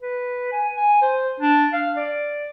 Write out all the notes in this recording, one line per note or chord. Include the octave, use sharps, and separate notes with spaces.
B4
G#5
G#5
C5
D4
F5
D5